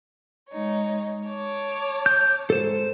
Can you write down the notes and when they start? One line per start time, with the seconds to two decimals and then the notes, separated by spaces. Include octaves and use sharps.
0.50 G#3 D#4 C#5
1.27 C#5 A5 D6
2.06 G6
2.50 G#2 A4 C5